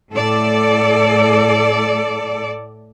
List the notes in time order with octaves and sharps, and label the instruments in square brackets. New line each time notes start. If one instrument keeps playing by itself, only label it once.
[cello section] A2 A4 D5